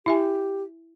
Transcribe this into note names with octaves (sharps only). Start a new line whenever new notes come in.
E4 G4 E5 G#5